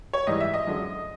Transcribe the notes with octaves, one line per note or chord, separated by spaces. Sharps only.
C#5
G#2 E3 G3 D#5
E5
D#5
F#2 D3 F3 G#3